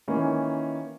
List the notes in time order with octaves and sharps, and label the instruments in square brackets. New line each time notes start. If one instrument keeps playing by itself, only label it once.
[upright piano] D#3 E3 A#3 C#4